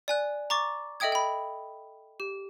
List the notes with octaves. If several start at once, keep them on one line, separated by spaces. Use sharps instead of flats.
D5 G#5 F#6
A#5 C#6 D6 A6
A4 D#5 E5 G5 D#6 G#6
G5 B5
G4